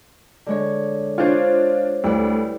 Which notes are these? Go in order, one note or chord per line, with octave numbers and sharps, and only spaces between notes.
D3 G#3 C#5
D4 F4 C5 C#5
D2 G3 E4 B4